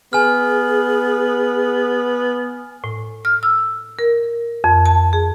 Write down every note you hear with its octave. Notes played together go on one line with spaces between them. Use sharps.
B3 G#4 G#5 F6
A2
F6
E6
A#4
F2
A5
G#4